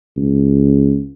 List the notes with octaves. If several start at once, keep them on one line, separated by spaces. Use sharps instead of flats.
C#2